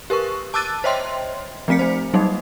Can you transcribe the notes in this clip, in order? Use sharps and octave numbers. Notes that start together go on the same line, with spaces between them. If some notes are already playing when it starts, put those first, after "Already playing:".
G4 A#4 B4 C#6
A5 D6 E6 F#6 A6 D#7
C5 C#5 D#5 E5 G5 C6
F3 A3 C4 B6 C#7
A3 C4 C5
F#3 G3 A#3 D#4